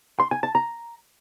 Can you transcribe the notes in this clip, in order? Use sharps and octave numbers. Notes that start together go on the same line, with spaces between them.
C6
G#5
A5
A#5